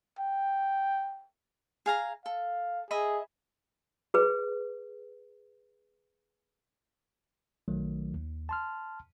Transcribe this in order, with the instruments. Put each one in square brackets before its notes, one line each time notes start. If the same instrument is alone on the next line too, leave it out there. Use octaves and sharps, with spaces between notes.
[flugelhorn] G5
[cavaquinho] G#4 F5 A#5
[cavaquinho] A4 [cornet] F5
[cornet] G#4 [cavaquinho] D#5 E5 B5
[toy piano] G#4 B4
[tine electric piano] B1 D#3 F#3 A3
D#2
A5 C6 F6